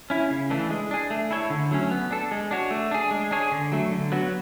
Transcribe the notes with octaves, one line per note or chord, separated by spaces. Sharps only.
C#4 E4
C#3
E3 A3 D4
G#3
D4 G#4
A3
E4 A4 C#5
D3
F#3 A3 C#4
B3
D4 A4
G#3
D4 F#4 C#5
A3
D4 G#4
G#3
D4 G#4 C#5
D3
F#3 A3
D3
F#3 B3 F#4